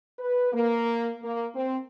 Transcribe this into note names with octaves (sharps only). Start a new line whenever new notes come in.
B4
A#3
A#3
C4